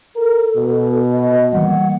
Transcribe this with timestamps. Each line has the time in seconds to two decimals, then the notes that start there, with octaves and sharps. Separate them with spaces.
0.16 A4 A#4
0.56 B2
1.11 D#5
1.53 E3 G3 A#3 F#5